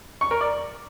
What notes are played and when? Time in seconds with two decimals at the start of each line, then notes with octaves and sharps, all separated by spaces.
0.21 C#6
0.31 A#4
0.41 D5